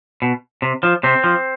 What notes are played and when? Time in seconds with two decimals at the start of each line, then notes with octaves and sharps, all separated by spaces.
0.22 B2
0.62 C3
0.83 F3
1.03 C3 C4
1.24 F3